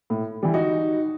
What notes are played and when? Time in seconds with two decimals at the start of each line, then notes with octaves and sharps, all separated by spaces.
0.10 A2
0.43 E3 G3
0.54 D#4 F#4